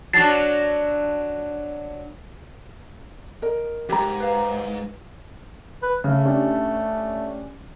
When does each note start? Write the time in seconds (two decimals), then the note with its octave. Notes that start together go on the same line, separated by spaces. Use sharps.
0.13 F#3 D4 A5 C7
3.42 A#4 D#5
3.89 F2 G#2 G4 A#5
4.20 B4 F5
5.82 B4
6.04 C#3 A3
6.25 C#4 D4 G4